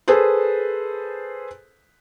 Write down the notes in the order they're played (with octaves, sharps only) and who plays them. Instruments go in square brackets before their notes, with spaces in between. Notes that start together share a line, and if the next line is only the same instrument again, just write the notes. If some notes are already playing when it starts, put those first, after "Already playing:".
[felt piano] G#4 A4 B4 C5